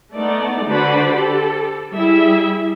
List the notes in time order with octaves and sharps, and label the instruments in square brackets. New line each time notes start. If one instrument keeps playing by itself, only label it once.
[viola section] A3 B3 D#4 D5
D3 F#4 B4 C5 D5 B5
G4 A4
G3 E4 G#4 E5